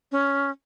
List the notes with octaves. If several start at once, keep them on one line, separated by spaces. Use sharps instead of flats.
C#4